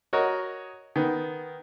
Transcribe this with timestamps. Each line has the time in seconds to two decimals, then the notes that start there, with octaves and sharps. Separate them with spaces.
0.13 F#4 A#4 C#5 D#5
0.96 D#3 B3